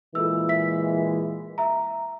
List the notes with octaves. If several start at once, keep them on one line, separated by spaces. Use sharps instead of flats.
A#2 E3 G#3 F4 A4 E6
E5 B6
E5 A#5